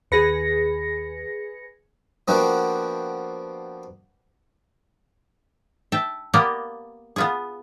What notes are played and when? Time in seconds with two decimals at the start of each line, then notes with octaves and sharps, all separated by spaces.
0.12 D#2 G#4 B4 A#6 C#7
2.28 F3 A#3 B3 D4 F#4 G4
5.92 E5 G5 A5
6.34 A#3 B3 G4 A#4 D5 D#5
7.16 B3 F4 G#4